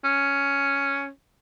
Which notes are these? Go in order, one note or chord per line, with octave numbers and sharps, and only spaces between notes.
C#4